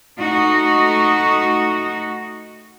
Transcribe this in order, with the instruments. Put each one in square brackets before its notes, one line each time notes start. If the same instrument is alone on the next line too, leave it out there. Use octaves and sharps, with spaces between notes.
[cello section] A3 D#4 F#4